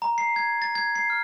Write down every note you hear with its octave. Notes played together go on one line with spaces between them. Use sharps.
A#5
C7
G#6
A6
G#6
C7
F6